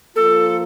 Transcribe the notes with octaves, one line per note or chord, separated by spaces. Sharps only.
F3 A#3 F4 A4